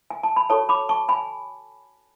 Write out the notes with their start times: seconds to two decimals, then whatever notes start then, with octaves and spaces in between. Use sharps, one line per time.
0.10 G#5
0.23 A5
0.36 B5
0.50 F#4 A4 C#5 A5 C#6
0.69 B5 D6
0.89 A5 C#6
1.09 G#5 B5